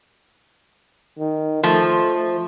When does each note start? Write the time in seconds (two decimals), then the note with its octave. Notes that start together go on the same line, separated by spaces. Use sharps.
1.18 D#3
1.63 F3 A3